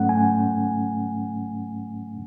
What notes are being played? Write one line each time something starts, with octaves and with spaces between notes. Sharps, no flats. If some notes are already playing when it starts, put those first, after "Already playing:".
Already playing: G#2 F#3 A3 C#4 F#5
G#5